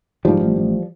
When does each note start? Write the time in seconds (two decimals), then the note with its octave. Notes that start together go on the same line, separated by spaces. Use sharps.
0.25 G#2 F3 G3
0.41 A1
0.56 A1